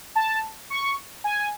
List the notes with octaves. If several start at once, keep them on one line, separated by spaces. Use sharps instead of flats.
A5
C#6
G#5